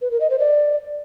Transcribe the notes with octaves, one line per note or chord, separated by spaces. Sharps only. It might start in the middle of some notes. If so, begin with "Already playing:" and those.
B4
A#4
D#5
C5
D5